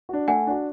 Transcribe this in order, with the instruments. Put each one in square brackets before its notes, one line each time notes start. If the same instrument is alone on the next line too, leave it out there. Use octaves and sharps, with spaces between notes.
[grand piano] D4 F#4
[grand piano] A3 [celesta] F#5 G#5
[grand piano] D4 F#4